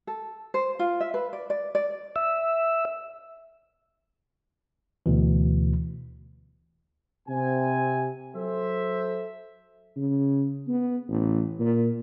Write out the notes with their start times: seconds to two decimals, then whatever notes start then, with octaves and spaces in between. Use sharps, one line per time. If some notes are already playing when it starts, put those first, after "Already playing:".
0.07 A4
0.54 C5
0.79 F4
1.00 E5
1.14 B4
1.33 D5
1.50 D5
1.75 D5
2.16 E5
5.06 D2 B2 E3
7.29 C3 G#5
8.35 F#3 A4 C5 E5
9.96 C#3
10.67 B3
11.09 A1
11.59 A#2